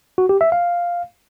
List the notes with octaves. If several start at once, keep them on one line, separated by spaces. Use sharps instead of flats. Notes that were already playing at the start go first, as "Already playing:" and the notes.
F#4
G4
E5
F5